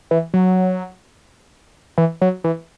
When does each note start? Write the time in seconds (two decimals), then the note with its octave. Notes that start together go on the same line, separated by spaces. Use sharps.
0.11 E3
0.34 F#3
1.98 E3
2.21 F#3
2.44 E3